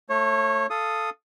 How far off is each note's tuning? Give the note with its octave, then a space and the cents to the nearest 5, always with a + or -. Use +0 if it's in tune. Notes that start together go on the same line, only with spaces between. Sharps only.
A3 +15 C#5 -25
A4 +0 F5 -15 D#6 +0